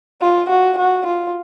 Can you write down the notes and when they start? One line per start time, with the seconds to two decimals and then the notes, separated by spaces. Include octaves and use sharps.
0.21 F4
0.49 F#4
0.78 F#4
1.06 F4